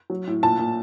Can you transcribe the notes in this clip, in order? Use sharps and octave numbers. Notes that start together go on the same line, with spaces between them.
F#3
A2
A#2 A5
A#2